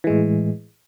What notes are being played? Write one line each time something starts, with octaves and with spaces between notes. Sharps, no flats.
A2 E3 G#3